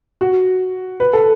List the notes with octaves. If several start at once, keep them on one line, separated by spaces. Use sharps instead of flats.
F#4
B4
A4